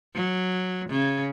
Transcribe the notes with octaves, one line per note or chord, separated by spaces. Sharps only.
F#3
C#3